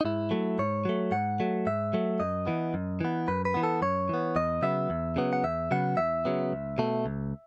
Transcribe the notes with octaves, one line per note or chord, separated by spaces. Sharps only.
D#4
G#2 E4
F#3 A3
G#2 C#5
F#3 A3
G#2 F#5
F#3 A3
G#2 E5
F#3 A3
F#2 D#5
E3 B3
F#2
E3 B3
F#2 B4
B4
E3 B3
A4
F#2 C#5
E3 B3
E2 D#5
C#3 F#3 B3 E5
E2
C#3 F#3 B3
F#5
E2 E5
C#3 F#3 B3 F#5
E2 E5
C#3 F#3 B3
C#2
B2 A3
C#2